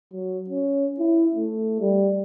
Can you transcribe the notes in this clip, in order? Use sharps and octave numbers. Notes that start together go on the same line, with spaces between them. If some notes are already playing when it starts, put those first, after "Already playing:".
F#3
C#4
E4
A3
G3